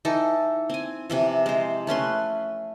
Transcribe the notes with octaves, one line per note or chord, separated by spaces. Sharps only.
E3 D#4 A4
C4 G#5
C3 E3 F3
G#3 C5
A3 C#4 B4 C6